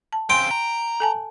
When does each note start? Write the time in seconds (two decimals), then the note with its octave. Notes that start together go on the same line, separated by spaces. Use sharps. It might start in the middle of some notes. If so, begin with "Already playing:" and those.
0.13 A5
0.30 C#3 C4 G5 G#5 C6
0.51 A#5
1.00 A4 G#5 A5